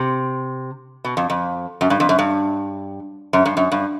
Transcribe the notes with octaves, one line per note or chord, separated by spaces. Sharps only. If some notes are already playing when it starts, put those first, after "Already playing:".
Already playing: C3
B2
F2
F2
F#2
G2
F2
F#2
G2
F#2
G2
F#2
G2